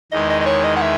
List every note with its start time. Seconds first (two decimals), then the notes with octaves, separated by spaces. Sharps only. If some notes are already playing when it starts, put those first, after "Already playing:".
0.12 E2 D#3 G#3 D#5
0.30 D#5
0.41 D#5
0.46 C#5
0.64 D#5
0.76 F#5
0.81 E5